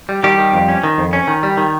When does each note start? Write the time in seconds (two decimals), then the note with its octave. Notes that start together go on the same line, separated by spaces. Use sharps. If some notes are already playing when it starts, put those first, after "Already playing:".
0.09 G3
0.23 D#3 G3 G4
0.38 D#3
0.53 F2
0.68 C#4
0.84 D#3
0.98 F2
1.13 C#4
1.28 D#3
1.43 G3
1.57 D#3